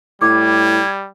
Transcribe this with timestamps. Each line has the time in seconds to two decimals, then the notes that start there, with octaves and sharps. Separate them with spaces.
0.22 A2 G3 D6 G#6